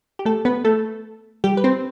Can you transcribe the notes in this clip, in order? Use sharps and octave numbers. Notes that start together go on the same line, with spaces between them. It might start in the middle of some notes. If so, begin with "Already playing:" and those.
G4
A3 A4
B3 B4
A3 A4
G3 G4
B4
C4 C5